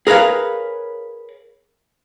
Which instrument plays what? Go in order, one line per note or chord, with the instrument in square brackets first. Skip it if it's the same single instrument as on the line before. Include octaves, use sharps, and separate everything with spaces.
[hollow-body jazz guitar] G#4 A#4 B4 C#5 F5